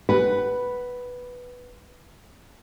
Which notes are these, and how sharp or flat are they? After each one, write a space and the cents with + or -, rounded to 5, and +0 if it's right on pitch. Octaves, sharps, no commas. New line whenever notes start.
B4 +0 F#5 +15